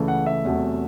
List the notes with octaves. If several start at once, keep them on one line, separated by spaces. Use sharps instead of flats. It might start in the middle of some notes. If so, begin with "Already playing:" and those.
Already playing: C#2 C#3 E3 A3
F#5
E5
E2 C3 F#3 A3